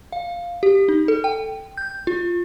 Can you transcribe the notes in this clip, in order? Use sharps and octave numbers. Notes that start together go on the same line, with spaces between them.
F5
G4
D#4
A4
G5
G6
F4